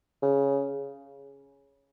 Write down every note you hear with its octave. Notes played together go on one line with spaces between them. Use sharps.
C#3